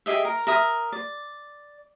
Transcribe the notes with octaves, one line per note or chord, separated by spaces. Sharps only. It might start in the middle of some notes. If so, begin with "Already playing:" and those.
G4 G#4 D#5 E5
A#4
A#4 E5 D#6
D5